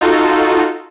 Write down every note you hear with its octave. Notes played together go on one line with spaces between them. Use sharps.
D#4 F4 F#4 A4